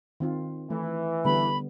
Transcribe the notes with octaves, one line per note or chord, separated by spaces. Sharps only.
D#3 C4 F4
E3 A3
D3 G3 B3 B5